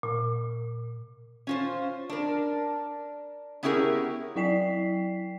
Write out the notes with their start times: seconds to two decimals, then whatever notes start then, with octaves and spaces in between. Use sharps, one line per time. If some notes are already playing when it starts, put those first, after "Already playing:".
0.03 A#2
1.47 C#4 F4 C5
2.10 D4 A#4
3.63 B3 C#4 E4 G4 G#4 A#4
4.36 F#3 E4 D5 G5 B6 C7